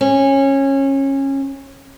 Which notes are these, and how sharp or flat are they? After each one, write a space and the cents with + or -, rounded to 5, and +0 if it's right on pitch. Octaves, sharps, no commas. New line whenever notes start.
C#4 -20